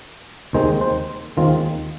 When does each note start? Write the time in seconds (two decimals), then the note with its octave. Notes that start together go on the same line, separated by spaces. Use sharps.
0.53 D#2 D#3 G#3 C4 C5
0.81 C5
1.37 D#2 D#3 G#3 C4 F4